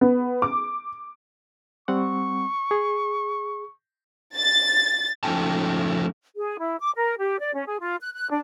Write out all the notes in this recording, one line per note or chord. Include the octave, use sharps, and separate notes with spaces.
B3
D6
G3 C4 F#5 C#6
G#4
A6
F3 A3 C#4 D#4 G5 A5
G#4
E4
D6
A#4
G4
D5
C#4
G#4
F4
F#6
F#6
D4